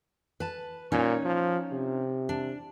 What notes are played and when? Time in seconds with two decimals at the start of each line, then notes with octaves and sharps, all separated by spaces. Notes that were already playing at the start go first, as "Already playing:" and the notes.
0.40 B4 A5
0.92 A#2 C#4 D#4 C#5
1.25 F3
1.72 C3
2.29 D4